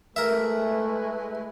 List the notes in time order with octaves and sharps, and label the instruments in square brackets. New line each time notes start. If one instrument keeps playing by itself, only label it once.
[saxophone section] G#3 E4 B4 [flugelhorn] A3 [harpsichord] A#4 E5